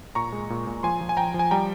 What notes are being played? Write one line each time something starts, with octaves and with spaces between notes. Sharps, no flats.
A#2 A#5 C#6
G#3
A#2
A#2
F3 G#5 C6
F3
G#5
F3 G5 A#5
F3
G#5
G3 G5 A#5